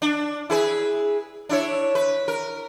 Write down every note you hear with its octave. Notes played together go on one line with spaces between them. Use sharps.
D4
E4 G#4 B4
D4 E4 C#5
B4
A#4